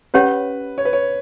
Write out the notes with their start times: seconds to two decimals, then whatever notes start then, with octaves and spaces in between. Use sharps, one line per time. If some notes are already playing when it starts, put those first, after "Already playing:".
0.14 C#4 G4 B4 C#5 F#5
0.78 C#5
0.85 B4
0.93 C#5